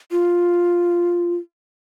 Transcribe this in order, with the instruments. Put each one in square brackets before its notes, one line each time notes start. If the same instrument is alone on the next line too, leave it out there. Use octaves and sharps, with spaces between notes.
[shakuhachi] F4